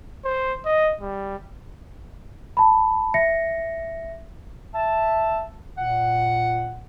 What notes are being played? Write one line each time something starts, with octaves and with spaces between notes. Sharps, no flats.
C5
D#5
G3
A5 B5
E5 A#6 C#7
E5 A5
A#2 F#5